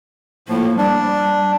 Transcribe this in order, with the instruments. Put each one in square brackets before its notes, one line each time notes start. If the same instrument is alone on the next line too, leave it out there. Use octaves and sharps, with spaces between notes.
[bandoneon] A2 F3 [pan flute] A#3
[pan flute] G3 [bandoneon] D4